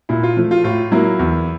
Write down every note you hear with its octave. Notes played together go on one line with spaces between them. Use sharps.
A#2 E4
F4
F3 A3
F4
A2 F4
F#3 A#3 E4
E2